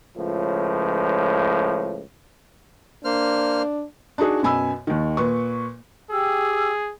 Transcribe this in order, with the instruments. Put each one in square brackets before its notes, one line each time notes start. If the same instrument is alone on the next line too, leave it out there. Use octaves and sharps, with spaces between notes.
[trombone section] C#2 A2 F3
[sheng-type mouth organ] A#3 C5 F6 [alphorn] D4
[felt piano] D4 D#4 F#4 G#4
F#2 B2 G#5 B5 E6
D#2 D#3
A#2 B4 C#6
[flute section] G4 G5 E6 [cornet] G#4